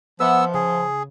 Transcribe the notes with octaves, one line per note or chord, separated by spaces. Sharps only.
F3 B3 B4 E5 F#5 E6
C#3 G#4